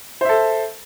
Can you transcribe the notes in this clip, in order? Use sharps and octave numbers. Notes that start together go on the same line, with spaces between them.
A4 C5 E5